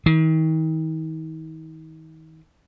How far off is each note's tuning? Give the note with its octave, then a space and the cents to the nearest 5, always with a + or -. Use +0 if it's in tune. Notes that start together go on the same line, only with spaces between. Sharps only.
D#3 +40